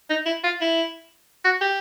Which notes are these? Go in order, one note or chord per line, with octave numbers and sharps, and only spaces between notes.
D#4
E4
F4
E4
F#4
G4